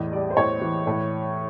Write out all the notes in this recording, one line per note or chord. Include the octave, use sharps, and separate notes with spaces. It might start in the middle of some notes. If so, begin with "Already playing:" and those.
Already playing: E2 A2 D#5
G3 D5
C5
A2 C#5
E3
A2